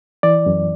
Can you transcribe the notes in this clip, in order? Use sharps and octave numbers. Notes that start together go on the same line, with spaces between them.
E3 D5
F#2